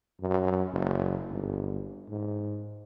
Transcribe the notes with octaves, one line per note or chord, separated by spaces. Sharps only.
F#2
F#1
G1
G#2